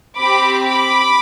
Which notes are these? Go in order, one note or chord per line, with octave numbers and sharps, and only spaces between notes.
C4 G4 B5 D6
B5 D6